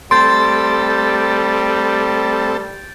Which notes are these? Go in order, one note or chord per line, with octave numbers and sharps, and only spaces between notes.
G3 A3 C4 A4 C6 G6 A6 D7